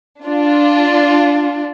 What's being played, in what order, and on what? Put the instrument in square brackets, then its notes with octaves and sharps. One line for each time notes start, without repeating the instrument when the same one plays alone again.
[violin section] D4 F4